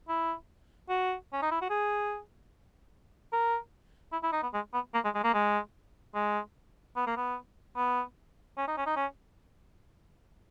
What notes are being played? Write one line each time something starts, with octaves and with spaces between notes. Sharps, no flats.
E4
F#4
C#4
D#4
E4
F#4
G#4
A#4
E4
E4
D#4
B3
G#3
B3
A#3
G#3
G#3
A#3
G#3
G#3
B3
A#3
B3
B3
C#4
D#4
C#4
D#4
C#4